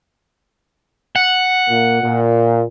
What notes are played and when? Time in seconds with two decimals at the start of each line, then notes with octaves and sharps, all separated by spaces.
1.16 F#5
1.69 A#2 A#3
2.02 A#2